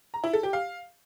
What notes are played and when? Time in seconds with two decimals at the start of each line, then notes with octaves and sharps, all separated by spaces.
0.14 A#5
0.24 E4
0.33 A4
0.43 G4
0.53 F5